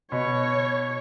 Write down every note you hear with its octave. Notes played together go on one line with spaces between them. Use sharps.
B2 C#5